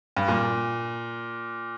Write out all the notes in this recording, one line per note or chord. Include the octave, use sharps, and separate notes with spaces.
G2
A#2